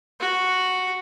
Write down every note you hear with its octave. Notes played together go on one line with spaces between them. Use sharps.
F#4